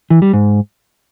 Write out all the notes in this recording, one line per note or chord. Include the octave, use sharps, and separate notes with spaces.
E3
G3
G#2